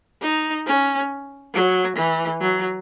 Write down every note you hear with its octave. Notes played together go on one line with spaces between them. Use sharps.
D#4
C#4
F#3
E3
F#3